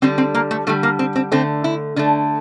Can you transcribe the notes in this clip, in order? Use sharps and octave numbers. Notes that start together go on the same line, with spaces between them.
D3 G3 C4
C4
A#3
A3
D3 G3 A3
A#3
C4
C4
D3 A3 C4
E4
D3 A3 D4